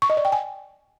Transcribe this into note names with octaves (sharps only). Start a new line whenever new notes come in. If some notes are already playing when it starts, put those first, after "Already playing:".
C#6
D#5
D5
G5
G#5